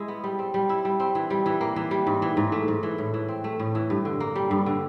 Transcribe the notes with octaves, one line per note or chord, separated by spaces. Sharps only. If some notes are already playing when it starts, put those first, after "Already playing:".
Already playing: G#3 E4
B3
G3
C4
G3
E4
G3
C4
E3
G3
E3
A#3
E3
G3
G#2
E3
G#2
A3
G#2
E3
A2
E3
C4
A3
A2
E3
G2
D3
A#3
G3
G2
D3